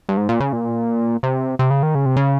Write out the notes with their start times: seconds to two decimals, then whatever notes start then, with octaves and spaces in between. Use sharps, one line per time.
0.09 G2
0.17 G#2
0.29 A#2
0.40 C#3
0.53 A#2
1.23 C3
1.59 C3
1.71 C#3
1.83 D#3
1.95 C#3
2.06 C3
2.17 C#3